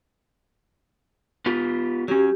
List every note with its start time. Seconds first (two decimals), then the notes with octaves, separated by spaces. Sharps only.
1.46 B3 F4 G4
2.08 F#3 C#4 G4